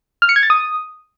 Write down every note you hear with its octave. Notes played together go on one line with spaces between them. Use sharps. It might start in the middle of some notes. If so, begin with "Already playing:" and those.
F6
C#7
G#6
A6
D#6